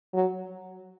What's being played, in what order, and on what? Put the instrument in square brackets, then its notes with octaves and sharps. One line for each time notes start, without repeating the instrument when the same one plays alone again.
[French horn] F#3